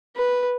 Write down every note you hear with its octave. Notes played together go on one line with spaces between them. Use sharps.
B4